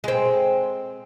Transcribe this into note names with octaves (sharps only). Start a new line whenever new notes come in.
G#3 C4